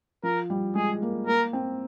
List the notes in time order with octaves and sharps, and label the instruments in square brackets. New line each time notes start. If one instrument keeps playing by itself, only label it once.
[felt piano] F3 [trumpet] A#4
[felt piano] G3
[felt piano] G#3 [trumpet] G#4
[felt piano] A#3
[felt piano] A#3 [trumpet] A#4
[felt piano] C4